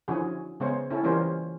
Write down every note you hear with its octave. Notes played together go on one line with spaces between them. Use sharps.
D3 F3 C#4 E4 F#4 G#4
C#3 G#3 B3 C5 C#5
C#4 E4 A4
E3 G3 A#3 C#4 F4 C5